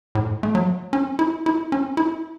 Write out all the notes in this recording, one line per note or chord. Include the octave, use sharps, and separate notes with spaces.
A2
A3
F#3
C#4
E4
E4
C#4
E4